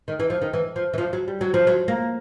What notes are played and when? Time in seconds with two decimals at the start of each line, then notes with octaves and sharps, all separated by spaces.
0.08 D#3
0.20 E3
0.30 F3
0.42 D#3
0.53 E3
0.76 F3
0.93 E3
0.98 F3
1.13 F#3
1.28 G3
1.41 F#3
1.54 F3
1.67 F#3
1.88 A#3